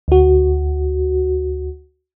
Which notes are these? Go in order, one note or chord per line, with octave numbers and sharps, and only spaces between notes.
D2 F#4